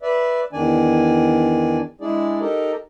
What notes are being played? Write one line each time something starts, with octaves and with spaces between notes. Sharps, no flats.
B4 D5 E5
E2 D#3 D4 D5 G#5
G#3 D4 E4 G#4 D5
D#4 G4 A4 A#4 D#5